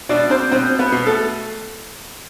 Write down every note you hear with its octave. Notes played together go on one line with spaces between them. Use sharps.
B2 D4 D5
C4 C5
B2 C4 C5
B3 B4
B2
A3 A4